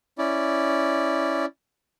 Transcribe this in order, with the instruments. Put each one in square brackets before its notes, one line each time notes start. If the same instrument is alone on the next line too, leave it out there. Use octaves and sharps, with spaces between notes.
[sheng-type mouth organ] C#4 E4 D5